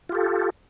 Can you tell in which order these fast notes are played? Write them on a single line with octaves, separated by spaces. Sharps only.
F4 G4 A4